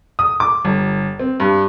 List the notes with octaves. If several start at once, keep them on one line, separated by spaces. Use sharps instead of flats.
D#6
D6
G1
C4
G2